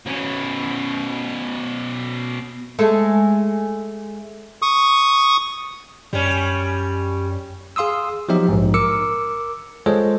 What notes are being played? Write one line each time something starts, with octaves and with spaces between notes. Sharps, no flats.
B2 C#4
G#3 A3 A4
C#6 D#6
F#2 G3 C#4
G#4 F5 C6 D#6 E6
F3 F#3 B3 D#4 G4 E5
A#1 G#2
A#4 D6 E6 C#7
G#3 F4 G#4 A4 C5 C#5